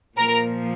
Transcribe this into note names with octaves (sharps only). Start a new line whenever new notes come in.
A#2 F3 A#4 A#5